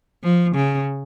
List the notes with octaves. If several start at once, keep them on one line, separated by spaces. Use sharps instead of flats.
F3
C#3